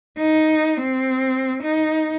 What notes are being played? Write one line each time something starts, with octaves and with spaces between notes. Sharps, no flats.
D#4
C4
D#4